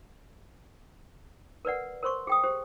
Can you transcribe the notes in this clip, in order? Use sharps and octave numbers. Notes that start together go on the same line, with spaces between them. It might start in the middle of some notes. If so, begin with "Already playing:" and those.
A#4 B4 D5 F#5
A#4 C5 C6 C#6
G#4 G5 D#6
G4 C5